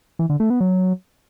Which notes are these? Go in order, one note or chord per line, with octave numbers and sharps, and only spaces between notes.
E3
D3
A3
B3
F#3